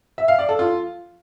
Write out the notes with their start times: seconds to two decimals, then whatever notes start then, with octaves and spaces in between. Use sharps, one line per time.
0.18 E5
0.28 F5
0.39 D5
0.49 A4
0.59 F4